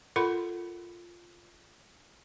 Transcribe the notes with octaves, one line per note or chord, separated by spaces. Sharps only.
F4 A4 A#4 F#5 B5 C6